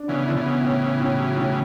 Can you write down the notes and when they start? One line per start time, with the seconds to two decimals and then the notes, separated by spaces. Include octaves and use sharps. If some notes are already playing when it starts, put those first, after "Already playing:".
Already playing: D4
0.08 C#3 E3 B3
0.27 D3 E4
0.36 C#3 E3
0.46 B3
0.64 A2
0.81 C#4
1.00 A2
1.18 F#3
1.37 A2